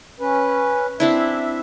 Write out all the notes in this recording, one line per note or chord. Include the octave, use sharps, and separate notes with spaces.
C#4 B4
C4 D4 E4 E5